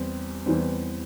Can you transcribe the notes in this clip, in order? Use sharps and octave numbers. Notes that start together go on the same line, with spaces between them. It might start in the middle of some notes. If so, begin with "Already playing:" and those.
Already playing: E2 G3 C4
E2 E3 G3 C4